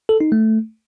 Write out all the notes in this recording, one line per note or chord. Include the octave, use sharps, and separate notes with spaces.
A4
D#4
A3